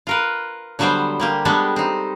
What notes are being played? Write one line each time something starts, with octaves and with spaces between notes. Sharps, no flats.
F4 A#4 B4
D3 F#3 G3 B3 C5 G5
G3 A#3 G4
G3 G#3 B3 D4 G4 A4
C4 D#4